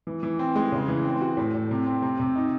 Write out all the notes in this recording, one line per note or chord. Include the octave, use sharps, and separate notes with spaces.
E3
E3
C4
G#3
C#3
E3
C4
F#4
A2
A2
C3
C4
C3
C3
D#4